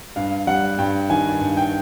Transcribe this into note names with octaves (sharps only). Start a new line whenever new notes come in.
G2 F5
G3 F#5
G2 G5
D#3 G#5
G2
G5